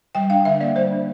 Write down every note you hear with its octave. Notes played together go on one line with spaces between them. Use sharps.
G3 G5
D4 F5
D3 E5
A#3 D5
G3 C5
D4